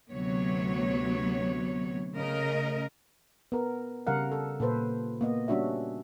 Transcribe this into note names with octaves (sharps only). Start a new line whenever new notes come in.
D2 C3 F#3 B3 C#5
C#3 A3 A#4 D#5
B3 A#4
C#3 G3 A#4 F5 F#5
A4
A#2 A4 B4 C5
A#3 B3 D#5
G3 C#4 D4 F#4 E5